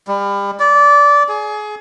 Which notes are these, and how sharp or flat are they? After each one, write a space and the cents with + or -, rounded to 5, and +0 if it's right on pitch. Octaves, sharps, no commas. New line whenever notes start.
G3 +35
D5 -20
G#4 +25